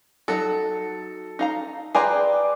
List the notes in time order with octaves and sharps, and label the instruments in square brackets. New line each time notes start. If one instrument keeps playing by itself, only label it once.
[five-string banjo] F#3 D#4 [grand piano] A4
[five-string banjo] D#4 F5 A#5
[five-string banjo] G#4 G#5 A#5 [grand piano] B4 G5 C6 [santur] D5